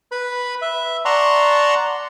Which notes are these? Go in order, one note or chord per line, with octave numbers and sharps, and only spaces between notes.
B4 B5
E5
D5 F#5 A5 A#5 C6 C#6